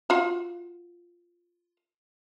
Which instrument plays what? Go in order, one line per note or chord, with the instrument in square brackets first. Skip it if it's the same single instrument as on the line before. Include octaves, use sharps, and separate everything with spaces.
[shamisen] F4 F#4